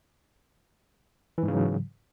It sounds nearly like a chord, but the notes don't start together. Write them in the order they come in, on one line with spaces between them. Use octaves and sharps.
E3 G#2 C#3 F#3